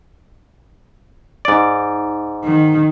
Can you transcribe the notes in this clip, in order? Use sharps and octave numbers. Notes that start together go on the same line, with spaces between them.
G#2 D5
D#3